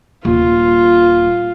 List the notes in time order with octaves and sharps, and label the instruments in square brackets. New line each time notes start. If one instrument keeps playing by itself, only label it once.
[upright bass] D#1 [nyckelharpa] F4